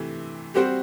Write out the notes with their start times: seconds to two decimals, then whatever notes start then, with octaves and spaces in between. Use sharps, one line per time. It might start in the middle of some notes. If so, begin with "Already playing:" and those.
Already playing: C3 E3 A3
0.55 G3 C4 F#4 G4 C5